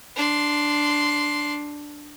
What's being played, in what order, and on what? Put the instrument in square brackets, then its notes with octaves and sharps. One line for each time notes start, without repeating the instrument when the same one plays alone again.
[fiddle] D4 C6